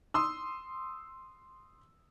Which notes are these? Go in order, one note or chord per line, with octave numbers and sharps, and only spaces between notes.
C6 D#6 E6